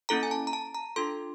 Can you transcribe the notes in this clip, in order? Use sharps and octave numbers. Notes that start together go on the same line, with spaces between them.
A#3 C#4 E4 A4 A#5
G#5
A5
A#5
A5
A#5
D4 F4 A4 C6